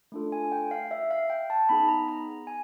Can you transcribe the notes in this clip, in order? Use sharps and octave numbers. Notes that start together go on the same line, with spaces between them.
A3 D4 F4 A4
G#5
G5
F5
E5
F5
G5
A5
B3 D#4 G#4 B5
A#5
A#5
G#5